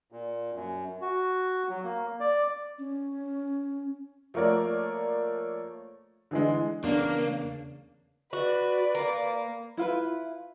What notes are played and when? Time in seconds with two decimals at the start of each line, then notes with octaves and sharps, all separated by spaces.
0.12 A#2
0.54 F#2
1.02 F#4
1.69 F#3
1.84 A#3
2.20 D5
2.79 C#4
4.34 F3 A3 A#3 A#4 C#5 D5
6.31 D3 E3 G#3
6.84 E2 C#3 A#3 B3 C#4 D4
8.33 F#4 B4 D5
8.95 A#3
9.77 E4 F4 B4